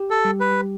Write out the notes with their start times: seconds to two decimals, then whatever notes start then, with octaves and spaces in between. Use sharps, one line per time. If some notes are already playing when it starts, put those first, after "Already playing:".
Already playing: G4
0.10 A4
0.25 G3
0.40 B4